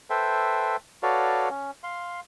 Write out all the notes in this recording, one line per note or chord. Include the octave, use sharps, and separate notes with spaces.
A4 B4 C5 E5 G5
F#4 A4 B4 C#5 D5 F5
C#4
F5 C6